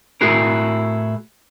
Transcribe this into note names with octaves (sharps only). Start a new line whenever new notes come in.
A2 E4 F#4 G#4 A#4